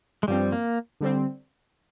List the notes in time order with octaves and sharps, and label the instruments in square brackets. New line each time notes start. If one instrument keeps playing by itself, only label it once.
[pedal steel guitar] G#3
[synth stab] G2 F3 C4 [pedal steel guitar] G3
[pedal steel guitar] A#3
[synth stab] D3 G3 C4